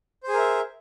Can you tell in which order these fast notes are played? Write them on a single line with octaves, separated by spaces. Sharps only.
C5 G#4 A#4 E5